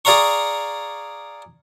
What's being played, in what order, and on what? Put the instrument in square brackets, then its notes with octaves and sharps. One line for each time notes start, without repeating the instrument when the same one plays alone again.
[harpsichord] G#4 D5 F5 A#5 C#6